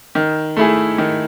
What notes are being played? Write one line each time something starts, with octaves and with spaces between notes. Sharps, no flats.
D#3
A3 E4 G#4
D#3